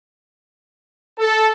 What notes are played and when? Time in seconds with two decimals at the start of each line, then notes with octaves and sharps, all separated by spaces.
1.19 A4